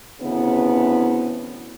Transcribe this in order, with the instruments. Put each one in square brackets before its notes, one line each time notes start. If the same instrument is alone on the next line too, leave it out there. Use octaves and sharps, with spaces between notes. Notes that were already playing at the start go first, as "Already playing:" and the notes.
[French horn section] D2 C#3 E3 B3 C4 E4